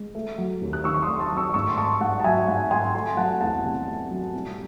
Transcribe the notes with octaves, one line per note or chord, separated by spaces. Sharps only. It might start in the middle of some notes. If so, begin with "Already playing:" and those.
Already playing: G#3
A3
F#3
D#2
F#6
D#3 C#6 E6
C#6
C6 D#6
A3
A5 C#6
F#3
C#6 E6
G#2 C#6 E6
C6
A3 A5 C#6
G#2 F#5 A5
A5
F#3 E5 G#5
G#2 F#5 A5
A3 G#5 C6
A3 G#5 C6
F#3 F#5 A5
E2 F#5 A5
C3
A3
F#3
C2